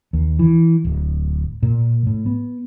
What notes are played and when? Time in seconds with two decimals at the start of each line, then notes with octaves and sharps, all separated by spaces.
0.13 D#2
0.39 E3
0.85 D1
1.63 A#2
2.07 A2
2.26 B3